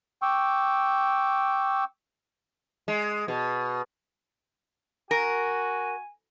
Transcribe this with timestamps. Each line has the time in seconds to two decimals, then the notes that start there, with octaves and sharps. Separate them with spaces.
0.22 G5 C#6 D6 E6
2.88 G#3
3.28 B2
5.11 F#4 A#4 G#5